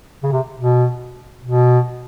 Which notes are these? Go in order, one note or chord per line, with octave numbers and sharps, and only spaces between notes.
C#3
C3
B2
B2